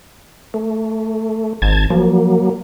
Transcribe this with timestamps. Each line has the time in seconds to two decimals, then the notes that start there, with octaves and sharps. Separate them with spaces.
0.54 A3
1.62 G#1 A5 G#6
1.90 F3 F#3 A#3